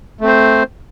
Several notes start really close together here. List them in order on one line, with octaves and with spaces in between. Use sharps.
A3 C4 C5